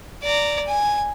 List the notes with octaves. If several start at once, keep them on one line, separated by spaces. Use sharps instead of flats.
D5 A#5
G#5